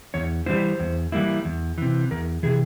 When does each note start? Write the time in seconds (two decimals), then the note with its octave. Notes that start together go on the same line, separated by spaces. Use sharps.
0.14 E2 C#5
0.46 E3 G3 A#3 E4 C5
0.80 E2
1.12 E3 G3 A#3 E4
1.45 E2
1.78 C3 E3
2.11 E2 A#4
2.43 C3 E3 G#4